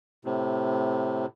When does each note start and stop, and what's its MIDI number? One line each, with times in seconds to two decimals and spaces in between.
0.25 1.26 45
0.25 1.26 48